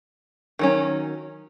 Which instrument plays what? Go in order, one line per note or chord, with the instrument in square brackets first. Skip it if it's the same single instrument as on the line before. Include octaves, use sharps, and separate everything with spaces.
[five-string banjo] D#3 F#3 C#4